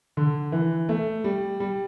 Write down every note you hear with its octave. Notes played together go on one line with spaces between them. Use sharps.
D3
E3
A3
G3
G3